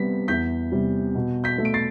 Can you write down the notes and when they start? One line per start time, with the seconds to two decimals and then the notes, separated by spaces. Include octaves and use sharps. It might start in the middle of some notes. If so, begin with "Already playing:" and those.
Already playing: C3 G3 B3 B6
0.28 E2 G6 B6
0.72 C3 G3
1.15 B2
1.44 G6 B6
1.58 A3
1.65 D7
1.74 A6 C7